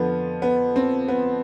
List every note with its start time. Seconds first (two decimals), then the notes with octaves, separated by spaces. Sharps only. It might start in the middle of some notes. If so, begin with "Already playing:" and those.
Already playing: F2 D3 F3 B3
0.42 B3
0.76 C4
1.08 B3